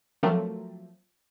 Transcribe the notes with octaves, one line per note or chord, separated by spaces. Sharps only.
F3 F#3 A3 A#3 C4